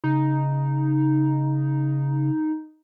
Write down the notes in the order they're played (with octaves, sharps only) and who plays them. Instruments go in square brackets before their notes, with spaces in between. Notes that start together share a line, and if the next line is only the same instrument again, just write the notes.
[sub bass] C#3 [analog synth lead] D#4